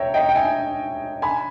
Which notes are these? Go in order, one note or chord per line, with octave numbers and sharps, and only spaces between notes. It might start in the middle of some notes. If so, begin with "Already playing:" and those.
Already playing: C#5 E5 G5 A#5
D#5 G5
G5
E5 G#5
G#5 B5